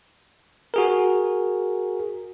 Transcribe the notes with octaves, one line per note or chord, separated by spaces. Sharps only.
F#4 G#4 A#4